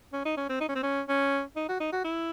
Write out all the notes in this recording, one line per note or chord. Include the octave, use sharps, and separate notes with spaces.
C#4
D#4
C#4
C4
D#4
C#4
C4
C#4
C#4
D#4
F#4
D#4
F#4
E4